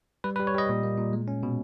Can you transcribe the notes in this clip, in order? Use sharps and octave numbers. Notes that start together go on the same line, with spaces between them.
G3 B4
B4
G3
C#5
G3 D#5
A#2
A#3
A#2
G#3
C#4
B2